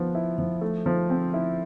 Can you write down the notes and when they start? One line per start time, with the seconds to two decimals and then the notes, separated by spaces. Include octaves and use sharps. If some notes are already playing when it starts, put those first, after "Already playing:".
Already playing: F3 B3
0.15 E4
0.38 F3
0.61 A3
0.86 F3
1.10 C4
1.34 E4